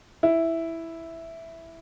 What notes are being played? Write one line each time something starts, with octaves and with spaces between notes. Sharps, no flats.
E4